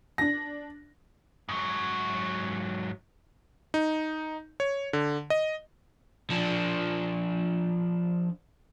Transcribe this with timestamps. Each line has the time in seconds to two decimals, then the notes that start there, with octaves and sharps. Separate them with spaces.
0.18 D4 A#6
1.49 G#2 F#3
3.74 D#4
4.60 C#5
4.93 D3
5.30 D#5
6.30 F3 D4